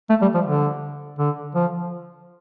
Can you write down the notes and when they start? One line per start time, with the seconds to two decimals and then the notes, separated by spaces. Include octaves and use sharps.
0.10 A3
0.22 G3
0.35 F3
0.46 D3
1.19 D3
1.55 F3